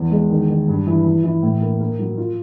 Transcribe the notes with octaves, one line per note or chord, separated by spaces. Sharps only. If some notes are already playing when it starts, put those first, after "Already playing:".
Already playing: E2
G#3
D#3
D#3
G2
E3
E3
E3
A2
A#3
A#3
F#3
F4